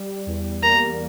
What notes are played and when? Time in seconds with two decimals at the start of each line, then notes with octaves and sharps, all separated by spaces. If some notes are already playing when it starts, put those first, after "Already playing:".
Already playing: G3
0.26 E2
0.62 A#3 A#5